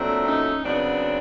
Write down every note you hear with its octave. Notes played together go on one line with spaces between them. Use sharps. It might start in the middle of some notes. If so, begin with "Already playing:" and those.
Already playing: A#2 F#3 A3 C4 D4
C#4 D#4
C#3 F#3 B3 C4 D4